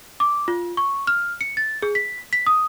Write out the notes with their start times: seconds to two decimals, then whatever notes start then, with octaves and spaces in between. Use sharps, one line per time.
0.20 D6
0.48 F4
0.77 C#6
1.07 F6
1.41 C#7
1.57 A6
1.82 G#4
1.95 B6
2.33 B6
2.47 D#6